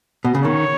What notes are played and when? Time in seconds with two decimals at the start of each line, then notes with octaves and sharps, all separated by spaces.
0.25 B2
0.35 C#3
0.44 D#3 C#5